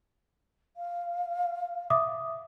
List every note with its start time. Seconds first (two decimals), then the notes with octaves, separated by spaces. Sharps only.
0.76 F5
1.90 E5 D6 D#6